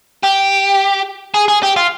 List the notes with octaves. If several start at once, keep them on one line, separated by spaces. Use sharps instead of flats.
G4
G#4
G#4
G4
F4